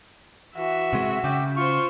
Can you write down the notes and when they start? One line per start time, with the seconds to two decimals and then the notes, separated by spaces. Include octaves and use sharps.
0.56 E3 F#4 E5
0.93 C3 G#3
1.24 C#3 G5 D6
1.56 F4 C5 C#6